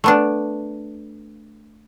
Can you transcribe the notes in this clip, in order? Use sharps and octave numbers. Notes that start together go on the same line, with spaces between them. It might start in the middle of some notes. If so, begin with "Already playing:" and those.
A3 B3 D4